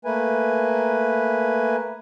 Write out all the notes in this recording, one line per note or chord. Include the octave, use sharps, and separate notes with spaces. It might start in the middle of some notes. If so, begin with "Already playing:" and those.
A3 A#3 B4 G#5